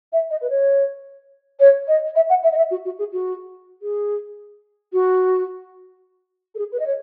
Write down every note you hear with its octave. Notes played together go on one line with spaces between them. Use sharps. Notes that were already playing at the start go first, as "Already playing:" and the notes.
E5
D#5
B4
C#5
C#5
D#5
E5
F#5
E5
D#5
E5
F#4
F#4
G#4
F#4
G#4
F#4
A4
G#4
B4
D#5
C#5